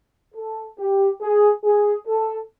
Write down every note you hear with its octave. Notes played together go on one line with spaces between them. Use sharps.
A4
G4
G#4
G#4
A4